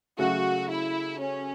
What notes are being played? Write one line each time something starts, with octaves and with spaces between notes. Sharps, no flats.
C#3 F#3 A3 F#4
E4
C#4